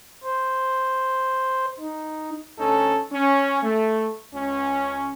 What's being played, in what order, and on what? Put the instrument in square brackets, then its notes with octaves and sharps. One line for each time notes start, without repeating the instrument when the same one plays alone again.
[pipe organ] C5
D#4
[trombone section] D2 C#4 D#4 A4
C#4
A3
C#2 C#4